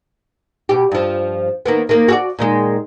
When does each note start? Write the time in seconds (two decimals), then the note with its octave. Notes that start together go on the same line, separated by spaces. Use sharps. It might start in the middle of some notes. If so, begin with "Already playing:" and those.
0.69 B2 G4
0.92 G2 F3
1.66 D#3 A#3 B3
1.89 D#3 A#3
2.08 F#4 A4 D5
2.38 A#2 D#3 G#3